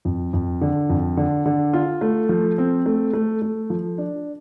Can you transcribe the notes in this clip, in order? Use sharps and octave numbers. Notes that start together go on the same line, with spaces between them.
F2
F2
D3
F2
D3
D3
F4
A3
F3
C4
A3
A3
A3
F3
D4